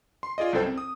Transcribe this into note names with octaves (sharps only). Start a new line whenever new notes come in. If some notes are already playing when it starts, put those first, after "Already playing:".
C6
F4 G#4 D5 D#5
C2 F#2 E4 A4 C5 G5
C4
D#6